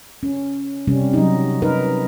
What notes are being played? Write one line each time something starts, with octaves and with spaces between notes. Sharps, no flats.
C#4
C3 G3 C#4
F#3 D#4
D#4 A#4 B4